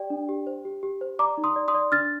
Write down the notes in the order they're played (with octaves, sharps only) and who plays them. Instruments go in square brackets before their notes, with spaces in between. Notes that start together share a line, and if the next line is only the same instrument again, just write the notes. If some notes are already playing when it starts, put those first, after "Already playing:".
Already playing: [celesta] G4 D5 G5
D4
G4
C5
G4
G4
C5
D5 A#5 D6
D#4
C6 D#6
D5
C6 D#6
D5
D4 F6 A6